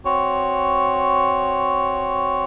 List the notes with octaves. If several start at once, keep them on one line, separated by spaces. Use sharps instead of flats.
C4 F#4 C#5